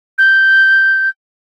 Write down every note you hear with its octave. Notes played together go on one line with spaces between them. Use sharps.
G6